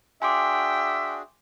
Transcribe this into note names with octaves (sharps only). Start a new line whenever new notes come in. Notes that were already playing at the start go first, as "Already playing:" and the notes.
D4 F#4 G#4 E5 G5 G#5 C6 D6